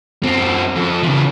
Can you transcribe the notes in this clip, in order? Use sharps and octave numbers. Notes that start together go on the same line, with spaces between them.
F#2 C4
F2
C#3 E3